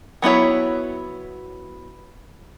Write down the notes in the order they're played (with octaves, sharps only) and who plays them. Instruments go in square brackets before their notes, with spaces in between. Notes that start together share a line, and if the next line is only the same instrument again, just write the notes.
[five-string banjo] F#3 B3 E4 C#5